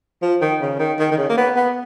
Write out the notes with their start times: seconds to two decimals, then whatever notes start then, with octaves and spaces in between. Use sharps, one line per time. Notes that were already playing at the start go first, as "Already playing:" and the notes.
0.22 F3
0.41 D#3
0.61 C#3
0.79 D#3
0.99 D#3
1.11 D#3
1.17 C#3
1.29 A#3
1.38 B3
1.56 B3